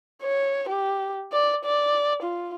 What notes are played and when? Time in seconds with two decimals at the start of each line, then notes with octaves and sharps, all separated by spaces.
0.23 C#5
0.69 G4
1.33 D5
1.65 D5
2.23 F4